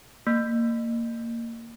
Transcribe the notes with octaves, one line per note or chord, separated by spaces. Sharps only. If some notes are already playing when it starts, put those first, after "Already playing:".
A#3